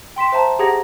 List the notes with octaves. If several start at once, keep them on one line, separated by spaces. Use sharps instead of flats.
G5 C6 B6 E7
C5 E5 A5 A#5
G4 G#4 F#5 A#5 G#6 A#6